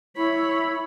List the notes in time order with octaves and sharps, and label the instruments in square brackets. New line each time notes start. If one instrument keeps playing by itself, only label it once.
[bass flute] E4 [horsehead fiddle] C#5 B5